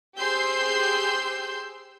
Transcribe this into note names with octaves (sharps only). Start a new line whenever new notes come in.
G4 G#4 C5 C6 E6 G6